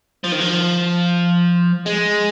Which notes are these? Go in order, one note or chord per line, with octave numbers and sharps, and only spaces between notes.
F3
D#3
F3
G#3